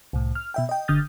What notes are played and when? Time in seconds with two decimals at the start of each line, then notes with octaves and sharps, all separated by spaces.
0.13 C2 A2
0.35 F6
0.54 B2 E5 G5
0.69 D#5 G5
0.88 G1 D3 D#6 F6 G6 A6